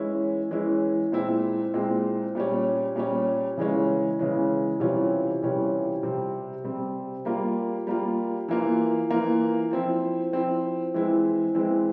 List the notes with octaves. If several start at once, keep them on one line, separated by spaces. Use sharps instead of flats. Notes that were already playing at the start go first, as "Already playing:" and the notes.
Already playing: E3 G#3 C#4 E4
E3 G#3 C#4 E4
A#2 G#3 C4 E4
A#2 G#3 C4 E4
A#2 G3 C#4
A#2 G3 C#4
C#3 E3 G#3 C#4
C#3 E3 G#3 C#4
C3 E3 G3 C#4 F4
C3 E3 G3 C#4 F4
C3 G3 C4
C3 G3 C4
G3 A#3 F4
G3 A#3 F4
E3 A#3 F4
E3 A#3 F4
F3 C4 E4
F3 C4 E4
E3 G#3 C4 E4
E3 G#3 C4 E4